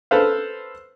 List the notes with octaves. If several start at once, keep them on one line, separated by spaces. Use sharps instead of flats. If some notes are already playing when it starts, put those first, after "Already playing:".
A4 B4 C5 F5